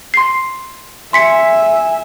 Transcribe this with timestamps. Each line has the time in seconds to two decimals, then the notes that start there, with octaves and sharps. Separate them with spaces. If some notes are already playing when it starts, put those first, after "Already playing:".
0.14 C6 C7
1.13 E5 G#5 C6 B6 C#7